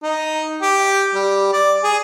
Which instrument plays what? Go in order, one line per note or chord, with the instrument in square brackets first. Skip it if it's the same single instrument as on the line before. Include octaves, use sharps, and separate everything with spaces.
[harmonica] D#4
G4
G3
D5
G#4